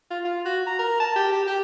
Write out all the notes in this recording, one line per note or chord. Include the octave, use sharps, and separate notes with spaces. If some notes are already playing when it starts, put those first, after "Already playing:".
F4
F4
F#4
A#5
A#4
A5
G4
G4
G4